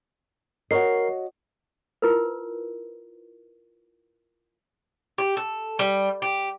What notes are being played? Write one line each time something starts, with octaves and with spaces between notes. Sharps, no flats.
F#4 A#4 C#5 D#5 C7
E4 F4 A#4 B4
G4
A4
G3
G4